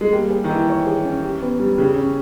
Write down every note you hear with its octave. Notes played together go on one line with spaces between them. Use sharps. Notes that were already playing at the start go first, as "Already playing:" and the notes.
G#3
G3 A#3
G#4
D#3
E3 D#4
C#5
G#4
C#4
G4
B3
G3
C#3 G4
C#4